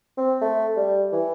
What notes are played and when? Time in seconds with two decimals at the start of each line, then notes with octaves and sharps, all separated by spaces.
0.18 C4
0.41 A3
0.76 G3
1.12 E3